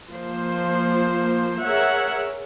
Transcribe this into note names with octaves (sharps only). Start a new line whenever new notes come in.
F3 A#3 C5
G#4 A#4 C#5 E5 F#5